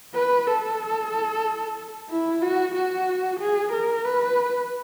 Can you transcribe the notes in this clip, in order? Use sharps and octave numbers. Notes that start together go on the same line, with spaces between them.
B4
A4
E4
F#4
F#4
G#4
A#4
B4